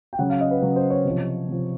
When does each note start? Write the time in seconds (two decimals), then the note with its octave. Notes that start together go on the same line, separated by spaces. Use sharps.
0.13 G5
0.19 C#3 F#3 F#5
0.30 F5
0.41 D#5
0.51 B4
0.62 C#3 F#3 B4
0.76 C5
0.90 C#5
1.05 C3 F3
1.48 C3 F3